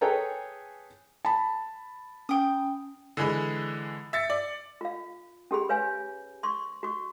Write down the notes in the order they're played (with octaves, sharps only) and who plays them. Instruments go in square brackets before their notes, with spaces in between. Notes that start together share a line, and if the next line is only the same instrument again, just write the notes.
[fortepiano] G#4 A4 B4 C#5 G5 A#5
[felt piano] A5 B5
[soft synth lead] C#4 [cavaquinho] G5 D#6
[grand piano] D3 E3 G#3 B5
E5 A6 C#7
D5
[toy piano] F4 F5
C#4 G4 G#4 B5
B4 C#5 F5 G#5
C6 C#6
F#4 C#6